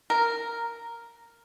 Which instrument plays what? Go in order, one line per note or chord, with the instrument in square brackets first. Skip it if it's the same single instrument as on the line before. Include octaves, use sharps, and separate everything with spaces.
[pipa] A#4